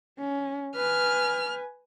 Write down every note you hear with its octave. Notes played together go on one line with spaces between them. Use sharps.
C#4
B4 G#5 F6